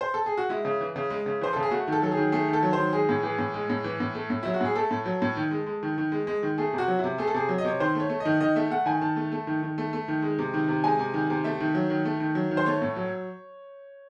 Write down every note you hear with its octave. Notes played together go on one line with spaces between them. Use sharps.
C5
A4
G#4
F#4
G#3 E4
C#3
E3
C#3
G#3
C#3
E3 C5
C#3 A4
G#4
A3 F#4
D#3 A4
F#3 A4
G#4
D#3
A3 G#4
D#3
A4
F#3
C5
D#3
G#3 G#4
A2
E3 G#4
A2
G#3
A2
E3
A2
A3
A2
F#3 E4
F#4
A2 G#4
A3 A4
A2
F#3
A2
D#3
G#3
G#3
D#3
D#3
G#3
G#3
D#3
A3 G#4
C3
F#4
F#3
C3 E4
A3 G#4
A4
C3 G#4
F#3
D#5
C3 C#5
D#3 C5
A3 C#5
A3
D#5
D#3
D#3 D#5
A3 E5
A3 F#5
D#3 G#5
D#3 A5
A3
A3
D#3
D#3
A3
A3
D#3
G#3
C3
D#3
C3
G#3 G#5
C3
D#3
C3
A3 E5
D#3
F#3
D#3
A3
D#3
F#3
D#3
C5
A3 C#5
A2
F#3